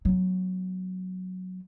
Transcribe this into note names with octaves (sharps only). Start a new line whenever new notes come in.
F#3 B3